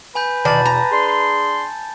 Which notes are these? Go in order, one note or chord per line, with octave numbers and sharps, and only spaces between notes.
B4 G#5 B5 G6
E2 B2 D#3 D5 A5 A6
A#5
D4 G#4 C6